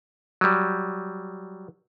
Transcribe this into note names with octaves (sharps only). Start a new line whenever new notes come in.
F#3 G3